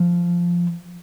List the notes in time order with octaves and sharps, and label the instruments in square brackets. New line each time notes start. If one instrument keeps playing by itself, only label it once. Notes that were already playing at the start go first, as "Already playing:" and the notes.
Already playing: [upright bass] F3